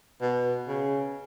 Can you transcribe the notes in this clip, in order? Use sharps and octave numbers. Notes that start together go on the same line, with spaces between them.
B2
C#3